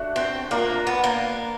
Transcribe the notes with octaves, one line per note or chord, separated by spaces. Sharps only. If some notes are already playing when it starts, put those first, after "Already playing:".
Already playing: A3 D4 F#4
C4
A#3 D4 F4 A#4 D5
B3
A#3